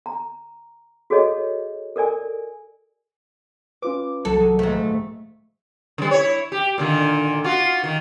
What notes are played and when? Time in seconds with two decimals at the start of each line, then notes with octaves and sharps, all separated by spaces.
0.06 A#5
1.10 F#4 G#4 A4 C#5 D#5
1.96 A4 A#4 D5 G#5
3.82 C#4 F4 B4 D6
4.25 C2 F#3 A4
4.39 F#3 G#4
4.59 D#1 G#2 F3 A3
5.98 D3 G3
6.11 E4 C#5
6.52 G4
6.78 A#2 D3 D#3
7.44 F4 F#4
7.84 D#3